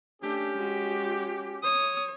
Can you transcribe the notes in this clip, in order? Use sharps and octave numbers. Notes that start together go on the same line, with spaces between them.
A3 C#4 D4 G4
G#3 F#4
C#5 D#6